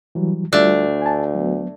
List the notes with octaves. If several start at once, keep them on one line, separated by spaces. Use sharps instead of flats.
E3 F#3 G3
D2 G3 A3 D4 F4 D5
G#5 A5
F#3 B3